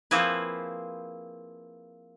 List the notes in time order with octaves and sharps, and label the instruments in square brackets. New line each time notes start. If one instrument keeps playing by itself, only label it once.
[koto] F3 A#3 C4 E4 G#4 B4